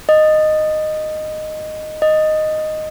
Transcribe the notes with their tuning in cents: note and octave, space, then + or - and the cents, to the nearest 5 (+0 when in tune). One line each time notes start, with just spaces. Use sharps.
D#5 -10
D#5 -5